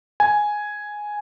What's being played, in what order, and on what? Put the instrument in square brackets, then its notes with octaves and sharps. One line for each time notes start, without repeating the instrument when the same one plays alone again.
[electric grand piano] G#5